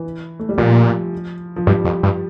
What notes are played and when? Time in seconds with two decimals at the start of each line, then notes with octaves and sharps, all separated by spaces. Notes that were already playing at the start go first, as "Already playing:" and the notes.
Already playing: E3
0.39 A3
0.49 G3
0.58 A#2 F3
1.56 F3
1.67 G2 G3
1.85 F2
2.03 G2